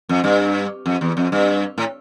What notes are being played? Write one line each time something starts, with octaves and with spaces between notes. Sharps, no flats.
F2
G2
F2
E2
F2
G2
A2